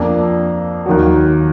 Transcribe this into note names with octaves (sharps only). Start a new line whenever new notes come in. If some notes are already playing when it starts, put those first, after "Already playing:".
Already playing: F2 F3 A#3 D4
D#2 D#3 F#3